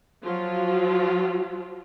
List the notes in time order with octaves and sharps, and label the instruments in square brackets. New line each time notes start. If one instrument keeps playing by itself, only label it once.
[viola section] F3 F#3 F4